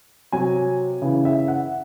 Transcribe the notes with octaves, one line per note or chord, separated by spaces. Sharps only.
C3 F#3 G#5
C#3 E3
E5
F#5